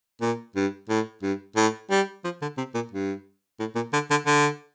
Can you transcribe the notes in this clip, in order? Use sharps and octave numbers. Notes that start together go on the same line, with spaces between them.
A#2
G2
A2
G2
A2
G3
F3
D3
C3
A#2
G2
A2
A#2
D3
D3
D3